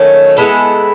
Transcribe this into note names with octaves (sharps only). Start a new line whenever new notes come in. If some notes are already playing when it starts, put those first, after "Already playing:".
Already playing: D#3 F#3 A3 C#4
G#3 B3 E4 A4